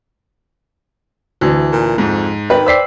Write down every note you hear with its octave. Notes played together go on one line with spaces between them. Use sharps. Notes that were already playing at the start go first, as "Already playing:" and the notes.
D2 E3
A#2
F2 G#2
D#3 B4 G5
C5 D5 G5 E6 B6 C7